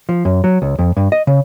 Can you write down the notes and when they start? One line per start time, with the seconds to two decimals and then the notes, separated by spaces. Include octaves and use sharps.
0.09 F3
0.25 F#2
0.44 F#3
0.62 C#2
0.79 F2
0.97 G2
1.12 D#5
1.27 C#3